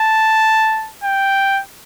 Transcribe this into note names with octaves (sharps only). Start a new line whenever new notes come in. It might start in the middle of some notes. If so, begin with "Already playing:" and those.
Already playing: A5
G5